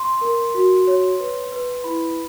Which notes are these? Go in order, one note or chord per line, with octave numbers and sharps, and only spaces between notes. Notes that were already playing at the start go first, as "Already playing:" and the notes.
Already playing: C6
A#4
F#4
C#5
B4
B4
E4 B5